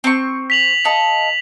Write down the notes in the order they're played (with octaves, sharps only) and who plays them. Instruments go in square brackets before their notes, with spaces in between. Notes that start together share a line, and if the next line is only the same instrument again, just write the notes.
[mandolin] C4 C#6
[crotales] B6 F7 F#7
[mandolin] A4 D#5 F5